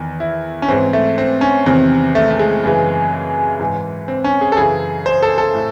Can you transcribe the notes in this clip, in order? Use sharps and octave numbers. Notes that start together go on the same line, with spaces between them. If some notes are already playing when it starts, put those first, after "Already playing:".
Already playing: E2 D#3
E4
C#4
G#2 E3 C4
A3
C4
C#4
E2 C3 D#3 C4
A3
A3
G#3
F#2 C#3 E3
G#2 E3
C4
C#4
G#4
A4
F#2 C#3 E3 G#4
C5
A4
A4
A2